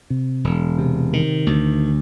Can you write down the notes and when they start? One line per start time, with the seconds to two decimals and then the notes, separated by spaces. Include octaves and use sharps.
0.10 C3
0.44 E1
0.78 C3
1.13 D#3
1.47 D2